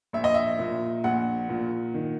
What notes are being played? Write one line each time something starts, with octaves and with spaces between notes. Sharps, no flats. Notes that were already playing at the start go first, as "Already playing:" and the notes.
A#1 E5
D#5
E5
A#2
A#1 F#5
A#2
D#3